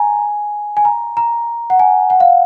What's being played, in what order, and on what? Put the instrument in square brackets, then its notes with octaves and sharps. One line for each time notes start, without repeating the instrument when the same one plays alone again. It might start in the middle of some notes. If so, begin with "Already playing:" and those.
Already playing: [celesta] G#5 A#5
G#5
A#5
A#5
F#5
G#5
F#5
F5